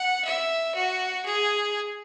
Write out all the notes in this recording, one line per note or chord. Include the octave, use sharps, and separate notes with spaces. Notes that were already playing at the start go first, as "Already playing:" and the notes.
Already playing: F#5
E5
F#4
G#4